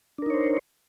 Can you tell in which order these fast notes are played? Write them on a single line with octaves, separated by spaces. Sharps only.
D4 A#4 D#4 C#5 C5